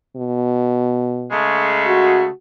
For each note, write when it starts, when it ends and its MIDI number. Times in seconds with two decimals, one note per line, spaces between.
0.16 1.33 47
1.32 2.27 49
1.32 2.27 56
1.32 2.27 57
1.87 2.31 66